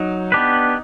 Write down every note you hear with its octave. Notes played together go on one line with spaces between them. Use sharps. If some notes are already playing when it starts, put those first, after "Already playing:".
Already playing: F#3 D#4
B3 D4 G4 B4